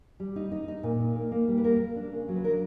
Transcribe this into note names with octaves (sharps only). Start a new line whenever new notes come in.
G3
D#4
D#4
D#4
A#2
D#4
A#3
A#3
G3
B4
A#3 A#4
A#3
D4
C#3
F#3
B4
D4 A#4